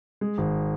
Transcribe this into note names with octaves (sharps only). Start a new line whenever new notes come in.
G#3
G#1